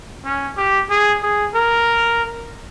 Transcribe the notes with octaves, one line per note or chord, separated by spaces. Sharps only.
C#4
G4
G#4
G#4
A#4